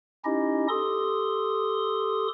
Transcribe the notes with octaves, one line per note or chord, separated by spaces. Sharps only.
C#4 D#4 E4 G4 D#5
G4 A4 C6 D#6